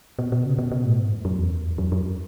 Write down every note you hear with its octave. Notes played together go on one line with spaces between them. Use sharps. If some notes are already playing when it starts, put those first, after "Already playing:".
B2
B2
C#3
B2
B2
A2
G#2
F#2
F#2
E2
F#2
F#2